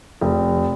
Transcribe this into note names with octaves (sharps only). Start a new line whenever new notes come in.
F1